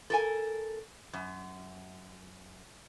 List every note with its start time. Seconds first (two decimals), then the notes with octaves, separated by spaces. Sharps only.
0.10 A4 A#4 G#5
1.13 F#2